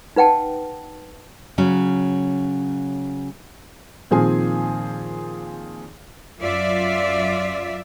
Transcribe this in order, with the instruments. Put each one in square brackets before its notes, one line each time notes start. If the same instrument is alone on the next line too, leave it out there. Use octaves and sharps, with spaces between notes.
[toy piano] D#4 B4 F#5 G5 A5
[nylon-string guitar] C#3 F#3 C#4
[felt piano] A#2 D#3 F3 C4 G#4 G#5
[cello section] F#2 F4 D5 E5